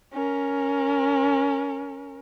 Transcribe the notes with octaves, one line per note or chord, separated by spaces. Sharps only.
C#4 A#4